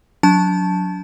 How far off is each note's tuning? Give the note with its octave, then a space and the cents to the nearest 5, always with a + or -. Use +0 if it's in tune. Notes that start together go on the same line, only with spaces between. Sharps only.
F#3 -15 D4 -35 A5 +0